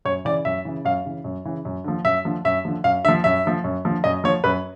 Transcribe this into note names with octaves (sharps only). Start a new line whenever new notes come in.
F#2 C#5
C#3 E3 D5
F#2 E5
C#3 E3
F#2 F5
C#3 E3
F#2
C#3 E3
F#2
D3 F3
F#2 E5
D3 F3
F#2 E5
D3 F3
F#2 F5
D3 F3 E5
F#2 E5
D3 F3
F#2
D3 F3
F#2 D#5
D3 F3 C#5
F#2 B4